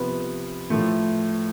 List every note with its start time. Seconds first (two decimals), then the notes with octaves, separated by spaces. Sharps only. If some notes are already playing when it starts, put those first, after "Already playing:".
Already playing: C3 F3 B3 B4
0.70 A2 F3 A3